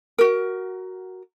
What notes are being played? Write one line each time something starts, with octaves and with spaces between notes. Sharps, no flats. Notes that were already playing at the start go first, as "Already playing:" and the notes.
F#4 A#4